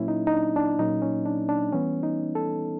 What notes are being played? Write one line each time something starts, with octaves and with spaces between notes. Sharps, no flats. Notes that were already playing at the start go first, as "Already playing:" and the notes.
Already playing: A#2 F#3 A#3 C#4 E4
D#4
D#4
D4
D4
A#2 F#3 A#3 C#4 D#4
C#4
D4
D4
E3 G3 B3 C#4
D#4
A4